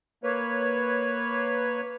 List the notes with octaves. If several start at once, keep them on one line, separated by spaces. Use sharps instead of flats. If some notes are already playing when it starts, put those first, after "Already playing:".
A#3 B4 C#5